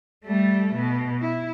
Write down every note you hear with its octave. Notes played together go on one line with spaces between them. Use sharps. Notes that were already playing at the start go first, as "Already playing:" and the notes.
G3 A3
B2
E4